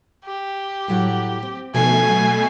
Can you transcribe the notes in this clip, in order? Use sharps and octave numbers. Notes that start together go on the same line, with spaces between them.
G4
A2 F#3 F#5
C4
B2 D3 D#3 F3 A3 G#5 C7
F#3